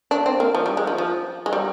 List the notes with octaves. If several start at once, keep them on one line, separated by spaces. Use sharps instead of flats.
D4
C4
A#3
F3
G3
G#3
F3
F3
G#3
G3